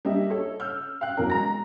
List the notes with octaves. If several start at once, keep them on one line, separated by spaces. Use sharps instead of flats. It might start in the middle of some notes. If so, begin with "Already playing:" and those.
G3 A#3 D4 G4 D#5 E5
A4 C#5
E6 F6 G6
F5 G5 F#6
E2 B2 F#3 A#4
G#3 A#5 A#6